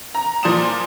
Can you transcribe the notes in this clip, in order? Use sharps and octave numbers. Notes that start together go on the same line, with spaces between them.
A#5
A#2 F3 D5 C6 D#6 E7